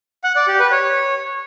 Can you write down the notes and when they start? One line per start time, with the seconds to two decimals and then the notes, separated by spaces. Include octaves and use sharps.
0.24 F#5
0.36 D5
0.48 G4
0.60 B4
0.71 C#5